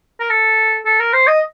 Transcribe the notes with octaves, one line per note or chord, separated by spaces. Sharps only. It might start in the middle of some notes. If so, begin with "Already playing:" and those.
A#4
A4
A4
A#4
C5
D#5